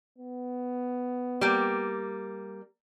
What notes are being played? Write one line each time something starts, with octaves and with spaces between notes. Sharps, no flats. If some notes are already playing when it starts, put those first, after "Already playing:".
B3
G3 A#3